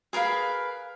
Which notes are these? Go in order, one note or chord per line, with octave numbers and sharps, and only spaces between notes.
G#4 A#4 B4 F5